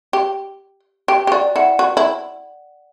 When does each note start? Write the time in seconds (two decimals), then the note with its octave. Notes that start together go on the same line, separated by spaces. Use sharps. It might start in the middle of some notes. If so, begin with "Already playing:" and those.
0.13 G4
1.08 G4 G5
1.27 G4
1.32 F#4 D5
1.56 E4 F#5
1.79 F#4
1.97 E4